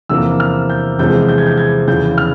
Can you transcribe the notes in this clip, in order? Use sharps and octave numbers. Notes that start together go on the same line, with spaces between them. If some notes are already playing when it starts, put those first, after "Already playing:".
E2 C3 F3 A#3 E6
F6
G6
E2 C3 F3 G#3 G6
G6
G#6
G6
G#6
E2 C#3 F3 G6
F6